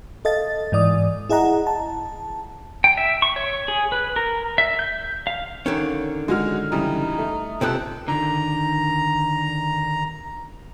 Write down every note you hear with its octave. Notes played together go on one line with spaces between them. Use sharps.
A4 D#5 F5 A6
G#2 E3 D5 D#6
E4 G#4 D#5 F#5 A#5
A5
G5
E5
C#6
C#5
G#4
B4
A#4
E5
G6
F5
D3 D#3 C#4
G#3 F#4 F6
C#3 E3 G3 D#4
A3
C#2 C3 C4 A4 F#6
D3 D#3 A#5